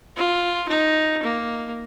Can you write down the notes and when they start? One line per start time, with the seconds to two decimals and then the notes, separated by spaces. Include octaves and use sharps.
0.17 F4
0.69 D#4
1.22 A#3